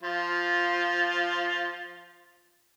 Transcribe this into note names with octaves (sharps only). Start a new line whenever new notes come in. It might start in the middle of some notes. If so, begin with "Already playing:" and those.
F3 F4